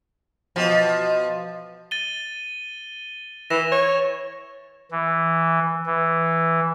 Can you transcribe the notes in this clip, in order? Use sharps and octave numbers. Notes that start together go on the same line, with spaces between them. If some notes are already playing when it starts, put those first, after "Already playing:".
B2 F3
A6 D#7 G7
E3 A#6 E7 F7
C#5
E3
E3